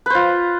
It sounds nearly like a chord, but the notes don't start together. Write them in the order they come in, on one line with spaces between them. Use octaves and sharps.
B4 C5 F4